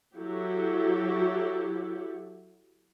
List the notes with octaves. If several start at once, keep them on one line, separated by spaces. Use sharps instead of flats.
F#3 E4 G4 A4